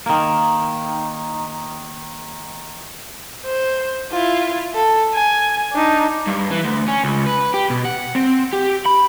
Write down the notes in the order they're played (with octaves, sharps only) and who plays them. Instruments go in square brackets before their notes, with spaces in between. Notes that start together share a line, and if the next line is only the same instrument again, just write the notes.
[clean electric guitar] D#3 A#3
[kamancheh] C5
E4 F4
A4
G#5
D4 D#4
[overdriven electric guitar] G2
E3
D2
C#4
C#2
B4
G4
B2
F#5
C4
G4
B5